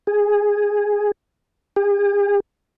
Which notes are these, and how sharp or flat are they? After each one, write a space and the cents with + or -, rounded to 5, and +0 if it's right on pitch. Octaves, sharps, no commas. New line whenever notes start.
G#4 -5
G#4 -45